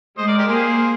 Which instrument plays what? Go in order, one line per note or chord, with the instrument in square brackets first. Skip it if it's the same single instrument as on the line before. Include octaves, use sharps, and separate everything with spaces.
[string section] G#3 [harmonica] C5 D#5
[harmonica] A#4 D5
G4 A#4
[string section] A#3 [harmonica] G#4 C5